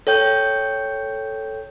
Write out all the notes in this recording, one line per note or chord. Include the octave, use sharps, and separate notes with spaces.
A4 C#5 G5 G6